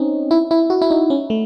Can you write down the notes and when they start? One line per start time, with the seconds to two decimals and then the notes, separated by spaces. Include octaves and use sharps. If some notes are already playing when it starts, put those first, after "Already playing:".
Already playing: C4 C#4 D#4
0.31 E4
0.51 E4
0.70 F#4
0.81 E4
0.90 D#4
1.10 C#4
1.30 A3